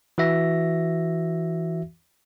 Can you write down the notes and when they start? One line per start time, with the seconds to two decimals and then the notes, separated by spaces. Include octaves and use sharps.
0.18 E3 F#4 E5 A#6